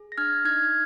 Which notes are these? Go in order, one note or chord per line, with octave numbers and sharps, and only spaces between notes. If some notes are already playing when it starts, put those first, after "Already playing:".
Already playing: G#4
A#6
D4 F6 G#6
D#4 F6 G#6